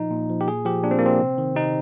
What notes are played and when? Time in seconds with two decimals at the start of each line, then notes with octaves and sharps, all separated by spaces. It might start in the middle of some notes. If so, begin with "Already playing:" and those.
Already playing: A#2 F3 D#4
0.11 A#2
0.30 F3
0.41 G4
0.47 A#2 G#4
0.65 F3 G4
0.84 A#2 D4
0.91 C4
0.99 A#3
1.02 F3 C4
1.20 C3
1.38 D#3
1.56 C3 D#4